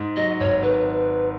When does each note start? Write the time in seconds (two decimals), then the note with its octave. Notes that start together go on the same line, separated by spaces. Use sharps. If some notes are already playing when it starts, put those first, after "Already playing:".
Already playing: G#2
0.16 F#3 D#5
0.40 G#1 C#5
0.62 D#3 B4